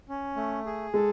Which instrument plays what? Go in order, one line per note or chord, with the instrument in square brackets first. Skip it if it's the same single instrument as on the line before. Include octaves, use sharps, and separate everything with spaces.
[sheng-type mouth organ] C#4
A3
G#4
[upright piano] G#3 [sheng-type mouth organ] A4